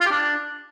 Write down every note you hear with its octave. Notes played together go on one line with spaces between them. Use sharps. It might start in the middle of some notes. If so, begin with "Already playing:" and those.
F4
G4
D4